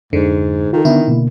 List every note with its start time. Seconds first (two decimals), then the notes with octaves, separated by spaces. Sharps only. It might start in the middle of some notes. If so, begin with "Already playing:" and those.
0.13 F2 G#2 D3
0.73 D#3 F4 A4
0.85 D3 B3 D4 E4
1.08 B2 D3 A#3